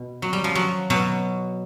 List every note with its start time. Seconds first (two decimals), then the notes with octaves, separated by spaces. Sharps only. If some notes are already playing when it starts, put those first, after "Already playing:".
Already playing: B2
0.22 F#3
0.33 G3
0.44 F3
0.55 F#3
0.90 B2 F#3